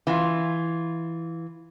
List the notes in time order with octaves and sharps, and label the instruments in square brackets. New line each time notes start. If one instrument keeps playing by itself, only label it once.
[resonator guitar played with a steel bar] E3 F4